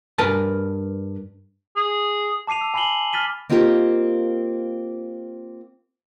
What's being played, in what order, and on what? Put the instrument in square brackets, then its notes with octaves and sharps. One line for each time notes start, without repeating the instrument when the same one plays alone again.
[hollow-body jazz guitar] G2 A#4 B4 G#5 A5
[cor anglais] G#4
[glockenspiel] A5 D6 C7 D#7 F7
E6
G#5 B5 C7 D#7 F#7 G7
F6 A6 B6 D#7 G7
[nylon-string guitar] A#3 C4 D#4 F4 G4 A#4